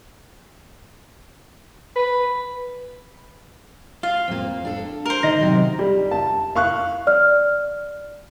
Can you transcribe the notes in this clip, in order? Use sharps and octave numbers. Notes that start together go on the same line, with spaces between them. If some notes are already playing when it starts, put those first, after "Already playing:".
B4
F4 F5
F2 A#3
D4 A4
A#4 C5
D3 D#3 D#5 A#6
C3 F#3
G3
A5
F5 C#6 F#6
D5 F6